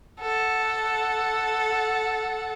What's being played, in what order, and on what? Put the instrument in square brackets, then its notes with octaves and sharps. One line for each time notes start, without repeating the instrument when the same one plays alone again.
[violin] A4 F#5